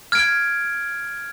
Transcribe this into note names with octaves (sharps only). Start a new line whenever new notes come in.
F6 G#6 D7